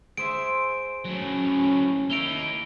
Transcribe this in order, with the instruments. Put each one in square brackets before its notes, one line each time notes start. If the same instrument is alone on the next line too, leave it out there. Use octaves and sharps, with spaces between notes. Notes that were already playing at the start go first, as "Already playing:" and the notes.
[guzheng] G#4 C5 E5 [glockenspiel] D7
[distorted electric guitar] A2 F#3 [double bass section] C#4
[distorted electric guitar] A#3 D#4 [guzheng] E4 [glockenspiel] D7 F7 G7